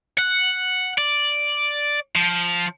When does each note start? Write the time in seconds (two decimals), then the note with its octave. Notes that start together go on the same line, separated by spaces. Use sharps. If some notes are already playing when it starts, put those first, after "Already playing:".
0.18 F#5
0.98 D5
2.16 F3